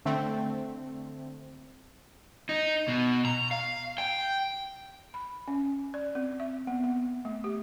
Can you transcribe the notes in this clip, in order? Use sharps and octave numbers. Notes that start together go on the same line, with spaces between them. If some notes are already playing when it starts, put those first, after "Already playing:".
D3 A3 C4
D#4
B2
A#5
F5
G5
B5
C#4
D5
C4
E5
B3
B3
A3
G4